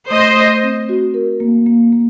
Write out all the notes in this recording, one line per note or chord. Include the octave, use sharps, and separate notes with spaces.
A3 C5 D#5
A3
C4
F#4
A#4
A#3
A#3
A#3